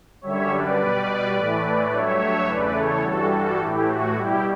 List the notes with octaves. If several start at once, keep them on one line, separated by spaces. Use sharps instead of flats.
F#2 D3 G3 C#5 E5
B4 D5
B2 G3
A2 E3 A3
G2 F#3 A3 C#5 E5
E2 C#3 E3 A3 B4 D5
A4 C#5
G2 E3 G3 F#4 A4
F#4 A4
A2 E3 A3 E4 G4
F#4
B2 G3 E4 G4